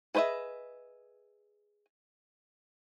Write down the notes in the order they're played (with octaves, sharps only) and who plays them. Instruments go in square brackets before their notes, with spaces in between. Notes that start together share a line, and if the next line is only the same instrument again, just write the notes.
[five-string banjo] G#4 B4 C5 D#5 E5